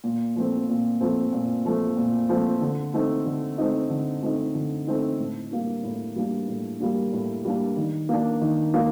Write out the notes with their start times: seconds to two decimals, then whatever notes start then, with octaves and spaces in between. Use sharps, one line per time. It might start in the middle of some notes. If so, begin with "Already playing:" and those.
0.04 A#2
0.36 F3 A3 C4
0.69 A#2
1.01 F3 A3 C4
1.33 A#2
1.65 F3 A3 C4
1.97 A#2
2.29 F3 A3 C4
2.61 D3
2.94 A3 C4 D#4
3.26 D3
3.58 A3 C4 D#4
3.90 D3
4.22 A3 C4 D#4
4.55 D3
4.87 A3 C4 D#4
5.19 A2
5.51 G3 A#3 D4
5.84 A2
6.16 G3 A#3 D4
6.48 A2
6.80 G3 A#3 D4
7.13 A2
7.45 G3 A#3 D4
7.77 D#3
8.09 A#3 D4
8.41 D#3
8.74 A#3 D4